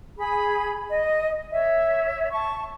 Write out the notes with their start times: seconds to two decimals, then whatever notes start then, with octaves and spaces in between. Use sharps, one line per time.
0.18 G#4 B5
0.90 D#5
1.52 C#5 E5
2.32 A5 C#6